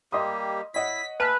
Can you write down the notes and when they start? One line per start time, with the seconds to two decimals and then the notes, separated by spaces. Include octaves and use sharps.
0.12 G3 A#3 G4 D#5 C6 D#6
0.74 E4 C#5 D#5 F#5 B6
1.20 B4 E5 G#5 A5 F6